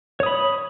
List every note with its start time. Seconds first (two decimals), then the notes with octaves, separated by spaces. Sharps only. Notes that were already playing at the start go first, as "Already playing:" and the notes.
0.20 C#5
0.23 D#6
0.26 B5